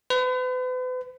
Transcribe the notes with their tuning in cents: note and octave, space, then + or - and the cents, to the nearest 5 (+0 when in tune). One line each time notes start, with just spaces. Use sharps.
B4 +40